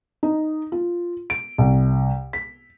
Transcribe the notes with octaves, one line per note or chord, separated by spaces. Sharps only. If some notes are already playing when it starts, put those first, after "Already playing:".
D#4
F4
D7
C2
B6